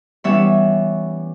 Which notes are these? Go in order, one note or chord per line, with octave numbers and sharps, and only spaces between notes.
E3 G3 B3 C#4 C#5 E5